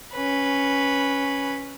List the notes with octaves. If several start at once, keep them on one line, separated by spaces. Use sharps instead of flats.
C#4 B4